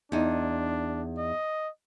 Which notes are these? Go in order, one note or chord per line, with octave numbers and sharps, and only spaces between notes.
E2 D4 D#4
D#5